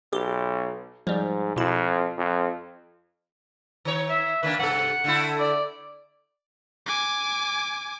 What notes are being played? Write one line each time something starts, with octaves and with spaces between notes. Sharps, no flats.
B1 G4
G#2 F3 G3
F2 B2 E4
F2
D#3 C#5
E5
D#3 A#3 D4 B4
G2 C3 A4 F#5
D3 A3 E4
D5
G#5 D6